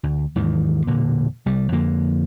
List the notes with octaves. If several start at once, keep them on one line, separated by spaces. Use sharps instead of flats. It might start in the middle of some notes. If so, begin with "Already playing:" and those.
D2
D#2 G#2 D#3 E3
E1 A#2 D3 A#3
C2 G3
F2 D3 A#3